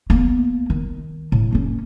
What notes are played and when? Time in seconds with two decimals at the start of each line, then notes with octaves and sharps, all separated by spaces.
0.10 A#3 B3
0.70 D#3
1.32 A2
1.52 A#3 C#4